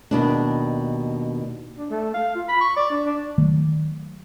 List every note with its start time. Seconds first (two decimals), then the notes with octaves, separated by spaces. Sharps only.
0.11 D#2 B2 D4
1.77 D4
1.90 A3
2.14 F5
2.35 F4
2.49 B5
2.61 C#6
2.76 D5
2.90 D4
3.05 D4
3.38 D#3 F#3 A3